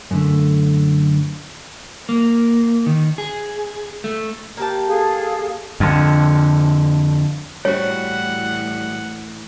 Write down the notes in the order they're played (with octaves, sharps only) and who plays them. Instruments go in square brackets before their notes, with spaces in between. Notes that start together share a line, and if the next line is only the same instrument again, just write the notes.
[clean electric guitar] F#2 D3 A3
[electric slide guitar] A#3
D#3
G#4
A3
[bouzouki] A#3 G4 A5
[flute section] G#4 A4 F5
[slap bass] F2 D3
[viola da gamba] A2 E3 [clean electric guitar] G3 F#4 [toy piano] C#5 [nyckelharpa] F#5